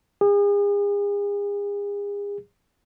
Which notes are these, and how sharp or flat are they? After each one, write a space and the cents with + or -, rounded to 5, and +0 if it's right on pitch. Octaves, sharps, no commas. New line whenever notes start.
G#4 -40